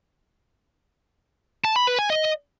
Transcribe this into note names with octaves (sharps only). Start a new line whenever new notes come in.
A5
B5
B4
G#5
D#5